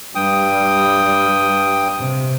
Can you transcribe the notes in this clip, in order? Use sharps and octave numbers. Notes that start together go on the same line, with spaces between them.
G2 G3 G5 D#6
C3